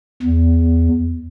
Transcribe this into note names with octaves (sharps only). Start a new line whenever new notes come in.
E2